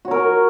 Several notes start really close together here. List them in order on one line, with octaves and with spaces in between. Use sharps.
F#4 C#5 A#4